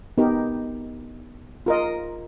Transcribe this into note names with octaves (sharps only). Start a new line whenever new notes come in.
B3 D#4 G4 A#4
F4 A#4 D#5